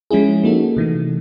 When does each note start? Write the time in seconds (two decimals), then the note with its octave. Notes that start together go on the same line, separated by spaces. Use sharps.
0.11 F3 G#3 C#4 E4 G#4
0.44 A#3 D#4 F#4 A4
0.76 C3 E3 A3